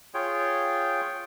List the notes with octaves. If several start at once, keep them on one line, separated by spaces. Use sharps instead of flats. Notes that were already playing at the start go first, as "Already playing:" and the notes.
F4 G#4 C#5 G5